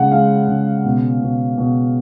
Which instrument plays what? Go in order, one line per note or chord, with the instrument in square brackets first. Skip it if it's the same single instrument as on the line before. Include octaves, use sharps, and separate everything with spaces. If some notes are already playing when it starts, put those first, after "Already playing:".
Already playing: [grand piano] C#3 G#3 F#5
G#3 F5
C#3
B2
B2
B2